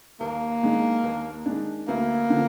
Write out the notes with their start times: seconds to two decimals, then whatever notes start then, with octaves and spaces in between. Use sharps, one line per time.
0.20 D#2 A#3
0.62 D#3 G#3 D4
1.04 D#2
1.46 D#3 G#3 D4
1.88 D2 A#3
2.30 D3 F3